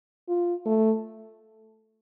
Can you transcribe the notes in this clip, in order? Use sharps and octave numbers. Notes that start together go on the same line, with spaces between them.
F4
A3